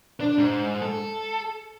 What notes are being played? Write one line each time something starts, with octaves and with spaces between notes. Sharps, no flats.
D4
G#2
A4